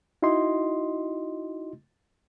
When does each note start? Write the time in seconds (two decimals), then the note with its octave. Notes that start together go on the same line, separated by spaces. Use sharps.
0.22 D#4 E4 F#4 D#5 C6